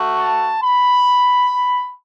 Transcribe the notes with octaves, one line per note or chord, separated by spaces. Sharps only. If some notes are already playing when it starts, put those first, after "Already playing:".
Already playing: A3 F#4
A5
B5